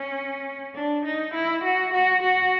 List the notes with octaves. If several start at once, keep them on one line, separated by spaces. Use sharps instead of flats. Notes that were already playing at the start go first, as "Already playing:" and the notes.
Already playing: C#4
D4
D#4
E4
F#4
F#4
F#4